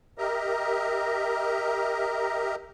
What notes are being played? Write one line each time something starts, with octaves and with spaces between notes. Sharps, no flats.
G4 A#4 D#5 E5 A#5